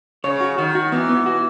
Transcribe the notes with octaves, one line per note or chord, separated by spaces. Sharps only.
C#3 C#5
F#4
D#3 F#4
F#4
E3 B3
B3
F#4